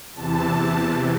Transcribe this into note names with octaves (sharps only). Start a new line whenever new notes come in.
E2 C3 E3 A5